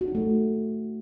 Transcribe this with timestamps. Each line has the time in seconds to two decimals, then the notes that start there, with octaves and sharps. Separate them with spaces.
0.01 F#4
0.08 D#4
0.15 A3